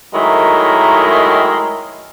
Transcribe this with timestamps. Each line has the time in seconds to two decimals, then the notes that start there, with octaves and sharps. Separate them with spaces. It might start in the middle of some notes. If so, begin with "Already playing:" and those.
0.14 D#3 F#3 G#3 A3 E4 A#4